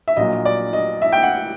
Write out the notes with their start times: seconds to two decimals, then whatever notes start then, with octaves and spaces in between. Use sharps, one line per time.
0.08 E5
0.17 A#1 A#2 F#3 D#5
0.45 D5
0.73 D#5
1.02 E5
1.12 G5
1.23 F#5